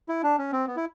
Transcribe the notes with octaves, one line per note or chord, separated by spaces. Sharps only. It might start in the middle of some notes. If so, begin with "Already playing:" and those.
E4
D4
C#4
C4
B3
E4